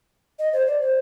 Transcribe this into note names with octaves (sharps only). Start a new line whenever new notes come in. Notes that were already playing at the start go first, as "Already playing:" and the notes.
D#5
C5
D5
C5